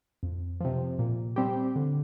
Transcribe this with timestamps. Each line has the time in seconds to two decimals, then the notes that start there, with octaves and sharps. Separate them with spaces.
0.23 F2
0.61 C3 F3
0.99 A#2
1.36 G3 C4 G4
1.76 D3